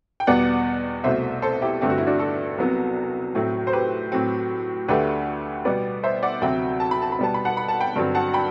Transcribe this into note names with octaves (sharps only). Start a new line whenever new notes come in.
G5
E2 B2 G3 B3 D5 F#5
C2 B2 A3 C5 E5
A4 C5
E4 G4
G2 D3 A3 C4 G4
F#4
E4
D4 F#4
F#4 A4
C2 C3 F#3 B3
A2 F#3 A3 C4
C5
G4 B4
A2 F#3 C4
D2 D3 A3 G4 B4
B2 G3 B3 B4 D5
C5 E5
D5 F#5
D2 C3 F#3 C4 E5 G5
A5
B5
A5
B5
B2 G3 B3 A5
B5
F#5 A5
B5
A5
G5 B5
G2 D3 F#3 C4
F#5 A5
G5 B5